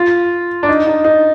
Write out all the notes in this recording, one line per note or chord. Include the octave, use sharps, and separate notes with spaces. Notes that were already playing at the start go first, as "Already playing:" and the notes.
Already playing: F4
D4
D#4
D#4
D#4